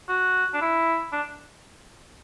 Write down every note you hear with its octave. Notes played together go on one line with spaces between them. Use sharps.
F#4
D4
E4
D4